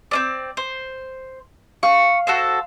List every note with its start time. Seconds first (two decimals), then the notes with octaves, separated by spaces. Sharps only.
0.11 C4 C#4 D5
0.57 C5
1.83 F5 C#6
2.27 F#4 A4 C5